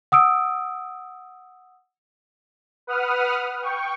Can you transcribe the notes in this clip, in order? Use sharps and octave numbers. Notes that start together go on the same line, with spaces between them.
F#5 D#6 E6 D7
B4 F#5 D#6 F6
G5 C#6